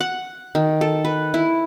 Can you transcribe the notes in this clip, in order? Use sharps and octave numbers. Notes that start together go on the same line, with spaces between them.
F#5
D#3
A4
B4
E4